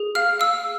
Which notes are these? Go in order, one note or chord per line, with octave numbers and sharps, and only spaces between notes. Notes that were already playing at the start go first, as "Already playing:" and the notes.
Already playing: G#4
F5 F6
F5 E6